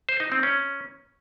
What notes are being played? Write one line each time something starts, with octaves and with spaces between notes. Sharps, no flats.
C5
D#4
C4
C#4